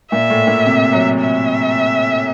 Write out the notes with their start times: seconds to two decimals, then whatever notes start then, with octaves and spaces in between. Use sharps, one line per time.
0.12 A#2 E5
0.30 A2
0.47 A#2
0.66 C3
0.93 F#3
1.20 E5